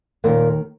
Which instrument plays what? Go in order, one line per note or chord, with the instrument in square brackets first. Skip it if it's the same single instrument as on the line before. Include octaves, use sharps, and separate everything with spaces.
[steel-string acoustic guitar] D#2 A#2 D#3 A#3